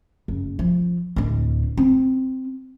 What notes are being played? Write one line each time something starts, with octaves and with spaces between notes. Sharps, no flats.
F#1
F3
D1 D4
C4